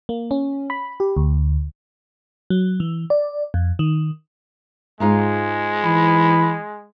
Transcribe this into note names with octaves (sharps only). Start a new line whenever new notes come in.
A#3
C#4
B5
G4
D2
F#3
E3
D5
F2
D#3
G#2 G#3 D#4 F4
E3 B5